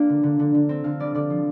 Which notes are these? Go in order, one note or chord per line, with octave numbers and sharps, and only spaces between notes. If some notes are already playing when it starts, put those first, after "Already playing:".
Already playing: A#3 D4 F4 F5 G5
D3
D3
D3
D3
C4
D3 F5
G3 D5
D3 D5
F3